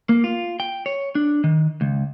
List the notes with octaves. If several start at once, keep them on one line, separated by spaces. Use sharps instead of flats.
A#3
F4
G5
C#5
D4
D#3
C#2